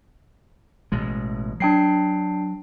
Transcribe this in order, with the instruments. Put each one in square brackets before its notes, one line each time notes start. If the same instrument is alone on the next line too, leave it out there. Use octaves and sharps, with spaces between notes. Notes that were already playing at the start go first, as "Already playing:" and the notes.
[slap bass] A1 B2 G#3
[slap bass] F#3 [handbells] D4 G5 C7